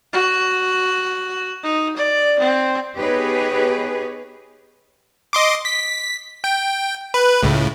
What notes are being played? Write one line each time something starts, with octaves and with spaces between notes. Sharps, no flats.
F#4
D#4
D5
C4
B3 D#4 G4 G#4 B4 C#5
D#5 C6 D6
B6
G5
B4
C#2 A2